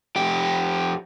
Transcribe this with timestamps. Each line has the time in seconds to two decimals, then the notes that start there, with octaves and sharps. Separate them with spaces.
0.16 F2 G4